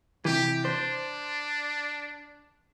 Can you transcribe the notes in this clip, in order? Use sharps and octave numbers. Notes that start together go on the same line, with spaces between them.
C3 E3 G4
D4 C5